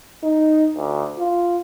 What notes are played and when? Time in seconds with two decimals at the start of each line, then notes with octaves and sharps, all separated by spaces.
0.23 D#4
0.77 D2
1.19 F4